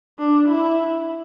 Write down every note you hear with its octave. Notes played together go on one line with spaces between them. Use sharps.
D4
E4